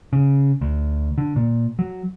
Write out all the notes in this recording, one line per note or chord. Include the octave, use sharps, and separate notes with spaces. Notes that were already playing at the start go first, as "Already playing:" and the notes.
C#3
D2
D3
A#2
F#3